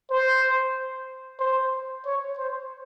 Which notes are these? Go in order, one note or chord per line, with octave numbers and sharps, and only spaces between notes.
C5
C5
C#5
C5